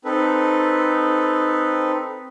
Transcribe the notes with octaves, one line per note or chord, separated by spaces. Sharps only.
C4 D#4 A4 B4